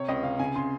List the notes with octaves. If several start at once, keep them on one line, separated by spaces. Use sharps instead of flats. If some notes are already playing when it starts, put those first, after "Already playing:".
Already playing: C3 C#5
C#2 D#5
C3 F5
C#3 G#5
C#3 C6